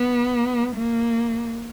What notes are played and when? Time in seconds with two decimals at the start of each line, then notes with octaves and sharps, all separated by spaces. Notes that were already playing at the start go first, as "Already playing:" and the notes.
Already playing: B3
0.76 A#3